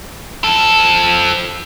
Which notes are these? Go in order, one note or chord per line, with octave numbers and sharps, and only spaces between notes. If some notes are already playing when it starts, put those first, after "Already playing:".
F3 A4